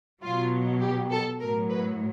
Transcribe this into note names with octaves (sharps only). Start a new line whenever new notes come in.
B2 F#3 F4
G4
A4
A2 F#3 A#4
B4